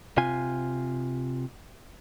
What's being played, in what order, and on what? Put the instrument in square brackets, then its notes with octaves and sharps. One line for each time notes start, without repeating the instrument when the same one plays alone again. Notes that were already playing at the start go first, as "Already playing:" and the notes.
[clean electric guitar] C3 F4 G#5